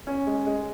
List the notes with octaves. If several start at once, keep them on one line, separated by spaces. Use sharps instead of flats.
C#4
G#3
G#3